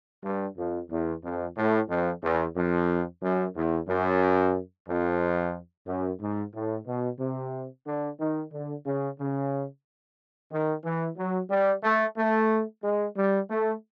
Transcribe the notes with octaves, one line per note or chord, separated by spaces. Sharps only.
G2
F2
E2
F2
A2
F2
E2
F2
F#2
E2
F#2
F2
F#2
G#2
A2
B2
C3
D3
D#3
D3
C#3
C#3
D#3
E3
F#3
G3
A3
A3
G#3
G3
A3